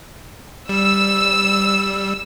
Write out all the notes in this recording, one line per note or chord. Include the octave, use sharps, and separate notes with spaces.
G3 E6